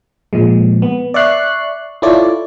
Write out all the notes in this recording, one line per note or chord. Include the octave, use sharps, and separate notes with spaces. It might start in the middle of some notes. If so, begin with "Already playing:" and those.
A#2 F3 G#3
B3
D5 E5 C#6 F#6 C7
E4 F4 A4 C#5 D5